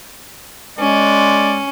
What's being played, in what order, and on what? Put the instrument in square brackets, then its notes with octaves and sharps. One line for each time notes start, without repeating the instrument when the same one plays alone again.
[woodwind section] G#3 [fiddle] C#4 [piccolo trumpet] D5